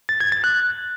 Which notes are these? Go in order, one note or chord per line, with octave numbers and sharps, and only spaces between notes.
A6
G#6
A6
F#6